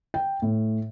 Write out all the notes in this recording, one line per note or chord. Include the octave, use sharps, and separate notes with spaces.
G5
A2